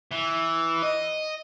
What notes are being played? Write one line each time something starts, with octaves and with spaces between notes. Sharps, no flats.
E3
D#5